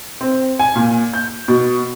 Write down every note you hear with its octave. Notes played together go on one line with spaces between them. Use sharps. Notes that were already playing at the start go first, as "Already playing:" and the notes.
C4
G#5
A#2
G6
B2